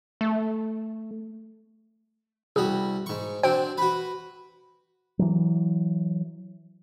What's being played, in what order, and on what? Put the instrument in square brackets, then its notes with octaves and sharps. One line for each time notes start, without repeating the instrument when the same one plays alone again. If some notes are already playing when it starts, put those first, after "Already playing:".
[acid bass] A3
[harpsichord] C2 G3 F#4 [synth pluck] G#4
[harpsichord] G#2 C#6
[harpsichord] F#3 C4 D4 [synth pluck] C5 G5
[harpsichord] F#4 B4
[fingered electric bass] E3 F#3